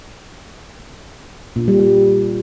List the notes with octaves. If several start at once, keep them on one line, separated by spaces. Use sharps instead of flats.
A#2
G3
G3